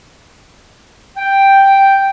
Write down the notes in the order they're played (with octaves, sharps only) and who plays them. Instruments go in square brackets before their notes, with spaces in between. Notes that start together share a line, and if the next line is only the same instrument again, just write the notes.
[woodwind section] G5